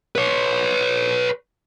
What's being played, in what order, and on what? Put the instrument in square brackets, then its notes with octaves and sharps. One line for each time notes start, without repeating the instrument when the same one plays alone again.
[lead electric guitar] B4 C#5